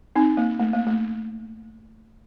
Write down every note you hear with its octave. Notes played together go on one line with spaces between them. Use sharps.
C4 D#4
A#3
A3
A#3
A3